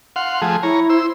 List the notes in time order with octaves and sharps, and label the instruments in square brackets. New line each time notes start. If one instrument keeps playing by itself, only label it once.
[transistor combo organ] F5 F#5 C6
F3 A3 G#4
[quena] E4 [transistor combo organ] C#5 A#5
[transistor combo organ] C5 E6